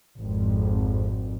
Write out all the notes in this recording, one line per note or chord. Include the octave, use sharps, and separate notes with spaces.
G#1 F2